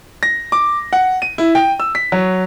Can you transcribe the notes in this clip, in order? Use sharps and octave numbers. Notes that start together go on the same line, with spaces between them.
A#6
D6
F#5
D#7
E4
G5
E6
B6
F#3